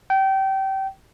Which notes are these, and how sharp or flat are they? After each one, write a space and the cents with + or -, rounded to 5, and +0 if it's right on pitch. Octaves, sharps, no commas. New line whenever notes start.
G5 -25